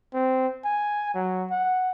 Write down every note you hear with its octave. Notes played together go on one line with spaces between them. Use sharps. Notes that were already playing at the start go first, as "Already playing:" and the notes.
C4
G#5
F#3
F#5